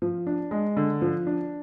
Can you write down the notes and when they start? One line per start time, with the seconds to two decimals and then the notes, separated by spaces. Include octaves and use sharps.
0.02 F3
0.27 D4
0.51 G#3
0.77 D3
1.02 F3
1.27 D4